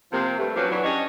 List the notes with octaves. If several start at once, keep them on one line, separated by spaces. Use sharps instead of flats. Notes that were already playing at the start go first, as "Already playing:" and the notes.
C3 F3 A#3
G2 A3
F3 F#3 C#4 G4 B4 F5
E3 F#3 D4
C#4 D4 G4 C#5 D#5